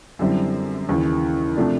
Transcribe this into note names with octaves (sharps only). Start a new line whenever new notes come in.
F#2 D3 G3 C4 E4
D#2 C#3 E3
C3 F3 A3 D4